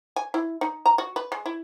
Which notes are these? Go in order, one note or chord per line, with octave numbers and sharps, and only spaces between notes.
G#5
E4
D#4
A#5
F#4
B4
G#3
E4